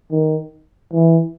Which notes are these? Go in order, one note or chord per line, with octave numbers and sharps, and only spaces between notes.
D#3
E3